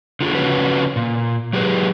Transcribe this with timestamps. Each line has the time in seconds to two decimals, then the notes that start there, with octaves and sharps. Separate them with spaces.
0.21 D3 F4 F#4 G#4
0.35 C#3 F3 C#4 F#4 B4
0.96 A#2
1.53 F#3 G4 G#4 B4